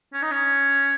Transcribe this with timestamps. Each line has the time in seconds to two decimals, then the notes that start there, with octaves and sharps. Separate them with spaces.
0.13 C#4
0.22 D#4
0.31 C#4